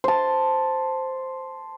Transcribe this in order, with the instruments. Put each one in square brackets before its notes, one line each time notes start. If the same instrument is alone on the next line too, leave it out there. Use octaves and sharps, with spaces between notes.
[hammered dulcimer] C5 A5